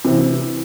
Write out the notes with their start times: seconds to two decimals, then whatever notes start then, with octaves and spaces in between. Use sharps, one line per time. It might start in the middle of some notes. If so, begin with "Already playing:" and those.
0.05 C3 E3